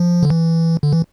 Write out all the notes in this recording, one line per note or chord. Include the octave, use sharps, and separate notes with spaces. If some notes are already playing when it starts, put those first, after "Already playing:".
Already playing: F3
D3
E3
D3
E3